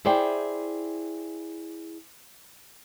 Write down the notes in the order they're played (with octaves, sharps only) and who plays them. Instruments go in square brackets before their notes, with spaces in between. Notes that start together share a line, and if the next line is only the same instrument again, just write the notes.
[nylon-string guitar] E4 G#4 C5 D5 G5